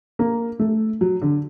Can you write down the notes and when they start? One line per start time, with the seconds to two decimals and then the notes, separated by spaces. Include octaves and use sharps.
0.19 A#3
0.59 A3
1.01 F#3
1.22 D3